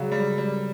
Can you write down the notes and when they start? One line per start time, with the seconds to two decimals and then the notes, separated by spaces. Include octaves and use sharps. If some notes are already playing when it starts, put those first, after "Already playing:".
Already playing: C#3 F#3 G3
0.12 G3
0.38 G3